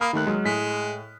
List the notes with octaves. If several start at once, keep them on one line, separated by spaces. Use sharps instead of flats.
A#3 B5 D#6 F6
D#2 D#3 A3 F#6
F#3 G#3
A2 G#3 B6